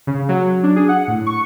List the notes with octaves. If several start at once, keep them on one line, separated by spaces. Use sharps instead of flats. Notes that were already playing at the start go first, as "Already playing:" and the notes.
C#3
F#3
D4
G#4
F#5
A2
C#6